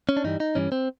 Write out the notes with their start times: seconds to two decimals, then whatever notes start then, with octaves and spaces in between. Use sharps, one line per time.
0.09 C#4
0.17 D4
0.24 G2 E3 G3 D#4
0.40 D#4
0.55 G2 E3 G3 C#4
0.72 C4